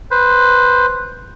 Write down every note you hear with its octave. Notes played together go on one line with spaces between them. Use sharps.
B4 C5